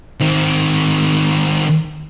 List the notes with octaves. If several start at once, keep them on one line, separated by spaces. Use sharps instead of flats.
D#3 C4